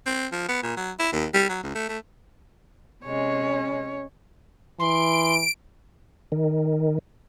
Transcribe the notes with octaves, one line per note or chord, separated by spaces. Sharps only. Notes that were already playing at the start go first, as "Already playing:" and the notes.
C4
F3
B3
A#2
F#3
E4
D#2
G3
F#3
C#2
A3
A3
C3 G#3 C#4 C#5
E3 C6 D7
D#3